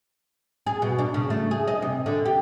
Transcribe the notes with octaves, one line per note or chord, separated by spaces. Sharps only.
G#4
B2
D4
C#3
A3
G#4
D#5
C3
D3
G4